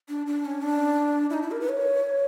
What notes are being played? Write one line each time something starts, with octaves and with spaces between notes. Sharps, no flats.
D4
D4
C#4
D4
E4
D#4
E4
A#4
B4
C#5